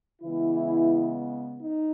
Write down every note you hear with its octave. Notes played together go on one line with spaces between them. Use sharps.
C#3 E3 G#3 B3 E4
D#4